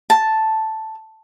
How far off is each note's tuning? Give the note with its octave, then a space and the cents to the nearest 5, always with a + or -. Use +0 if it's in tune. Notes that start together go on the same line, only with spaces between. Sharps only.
A5 +0